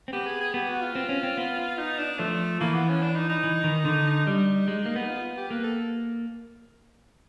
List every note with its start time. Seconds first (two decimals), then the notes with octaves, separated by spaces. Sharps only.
0.08 C4
0.13 B3 G4
0.26 G#4
0.41 G#4
0.54 B3 G4
0.68 F#4
0.81 F4
0.95 C4
1.09 C#4
1.23 C4
1.38 B3
1.78 D#4
1.99 D4
2.19 F3 A3
2.61 E3 A#3
2.74 B3
2.89 C#4
3.02 D4
3.16 D#4
3.30 D#4
3.44 E3
3.64 D#3
3.85 D3
4.26 G3 D#4
4.68 G#3
4.86 A#3
4.96 B3
5.09 F4
5.37 G4
5.51 A#3 B4
5.64 A4